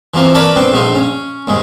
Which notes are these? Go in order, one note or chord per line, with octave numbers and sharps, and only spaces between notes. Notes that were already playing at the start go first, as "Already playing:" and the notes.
E3 F3 A#3 C4
A#4 B4 C#5 D5 A5 B5
B3 C4 D4
A#1 A3 D#4 F4
C#4
D#2 G#2 G#3